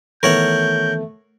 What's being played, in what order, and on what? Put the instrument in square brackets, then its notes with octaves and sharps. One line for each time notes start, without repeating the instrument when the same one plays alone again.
[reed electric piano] D#3 E3 B3 [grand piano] A3 [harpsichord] A#4 C#5 F#5 [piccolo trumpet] G6